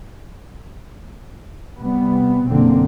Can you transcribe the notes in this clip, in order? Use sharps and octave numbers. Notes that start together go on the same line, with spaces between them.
C3 G3 B3
F#1 B2 D3 A#3 C4